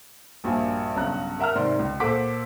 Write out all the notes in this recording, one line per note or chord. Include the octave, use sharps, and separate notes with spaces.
A#1 G2 A#2 F#4 G#5
B1 G2 C#3 A#5 F#6
A#4 E5 F#5 A#5 F6
G#2 C3 D#3 C4 D5 C6
C#2
A#2 A4 C5 F#5 D6 B6